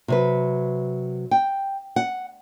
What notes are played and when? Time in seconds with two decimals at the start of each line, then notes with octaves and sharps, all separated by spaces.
0.08 C3 F#3 B4
1.31 G5
1.96 F#5